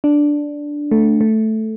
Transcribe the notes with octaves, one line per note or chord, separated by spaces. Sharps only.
D4
A3
A3